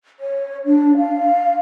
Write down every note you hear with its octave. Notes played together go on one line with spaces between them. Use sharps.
C#5
D4
F5